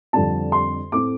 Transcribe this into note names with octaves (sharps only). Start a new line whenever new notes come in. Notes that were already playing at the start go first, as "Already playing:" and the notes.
F2 D3 G3 C4 A5
C6
A2 A3 C4 D6